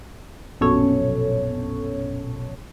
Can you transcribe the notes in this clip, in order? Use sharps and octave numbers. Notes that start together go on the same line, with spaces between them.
A#1 F#2 B2 C#4 A4 C#5